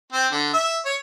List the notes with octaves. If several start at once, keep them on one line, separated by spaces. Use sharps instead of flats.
C4
D3
E5
C#5